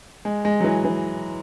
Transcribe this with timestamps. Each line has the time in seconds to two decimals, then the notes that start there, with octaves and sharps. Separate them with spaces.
0.25 G#3
0.45 G#3
0.60 F#3
0.64 E3
0.85 E3